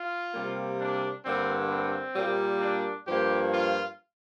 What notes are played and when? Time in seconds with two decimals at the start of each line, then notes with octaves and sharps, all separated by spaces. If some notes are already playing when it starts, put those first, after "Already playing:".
Already playing: F4
0.33 C3 G3 A#3
0.79 D4
1.24 G2 D3 A#3 C4
1.70 C4
2.15 A#2 G3 A#3
2.61 D4
3.06 G2 F3 A#3 G4
3.52 F4